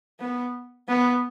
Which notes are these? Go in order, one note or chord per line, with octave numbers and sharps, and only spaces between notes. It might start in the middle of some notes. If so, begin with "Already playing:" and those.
B3
B3